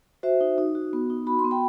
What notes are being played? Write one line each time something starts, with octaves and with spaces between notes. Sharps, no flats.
F#4 C5 E5
D#4
D#4
F#4
B3
D#4
F#4 B5
C6
B3
G5 B5